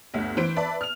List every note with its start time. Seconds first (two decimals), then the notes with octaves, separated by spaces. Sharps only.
0.14 G1 D2
0.37 E3 C5 D7
0.56 B4 D5 E5 A5
0.81 F6 F7